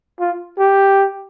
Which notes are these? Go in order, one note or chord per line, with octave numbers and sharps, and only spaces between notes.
F4
G4